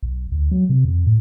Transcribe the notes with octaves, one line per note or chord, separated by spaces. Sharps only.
B1
D2
F#3
C3
F2
A2